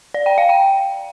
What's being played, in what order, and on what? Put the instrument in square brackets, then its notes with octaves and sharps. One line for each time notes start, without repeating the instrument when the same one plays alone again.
[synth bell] D5
G5
F5
G5